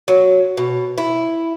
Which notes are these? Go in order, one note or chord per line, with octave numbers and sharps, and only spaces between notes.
F#3
B2
E4